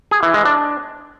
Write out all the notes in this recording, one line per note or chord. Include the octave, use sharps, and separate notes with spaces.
G#4
E3
G#3
D4